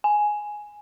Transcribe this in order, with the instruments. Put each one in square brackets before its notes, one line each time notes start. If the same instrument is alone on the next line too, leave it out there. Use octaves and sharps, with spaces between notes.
[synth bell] G#5